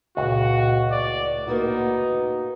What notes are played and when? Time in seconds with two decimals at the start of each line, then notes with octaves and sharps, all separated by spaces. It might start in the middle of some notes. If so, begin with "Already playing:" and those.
0.17 C#2 A#2 F#4
0.91 A2 D5
1.47 A#3 B3 D#4 F#4